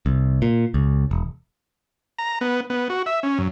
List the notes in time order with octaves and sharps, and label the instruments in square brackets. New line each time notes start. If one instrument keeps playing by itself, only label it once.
[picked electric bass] C2
A#2
C#2
E1
[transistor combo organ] A#5
B3
B3
F#4
E5
C#4
F#2